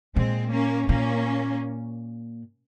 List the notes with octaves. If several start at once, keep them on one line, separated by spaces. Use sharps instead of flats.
A#2 G#3 C4
A#3 C#4
A#2 A#3 C#4